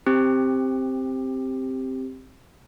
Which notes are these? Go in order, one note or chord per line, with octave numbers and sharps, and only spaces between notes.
C4 G4